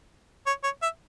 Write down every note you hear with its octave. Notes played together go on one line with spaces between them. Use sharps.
C#5
C#5
E5